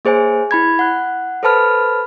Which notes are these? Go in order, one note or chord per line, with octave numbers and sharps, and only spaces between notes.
A#3 G#4 C5 C#5 G#5
E4 B5 G#6
F#5 F#6
A4 B4 C5 A5 B5 F6